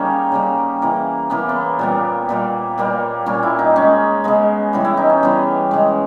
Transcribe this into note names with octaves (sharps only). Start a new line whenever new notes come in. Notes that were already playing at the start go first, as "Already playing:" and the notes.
Already playing: C#3 G3 A#3 C#4 D#4
C#3 G3 A#3
C#3 E3 A#3
C#3 E3 A#3 B3
B3
A#2 G3 A#3 B3
A#2 G3 A#3
A#2 G3 A#3
A#2 G3 A#3 C#4
E4
D#4
C#3 G#3 C#4
C#3 G#3 B3
C#3 E3 G3
E4
D#4
C#4
C#3 E3 G3 B3
C#3 G#3